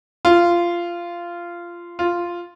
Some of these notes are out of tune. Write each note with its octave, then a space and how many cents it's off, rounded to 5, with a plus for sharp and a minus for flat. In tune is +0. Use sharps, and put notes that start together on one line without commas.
F4 -15
F4 -5